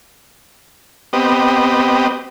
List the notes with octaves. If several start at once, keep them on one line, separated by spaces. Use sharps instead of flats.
B3 C4 G4 D#5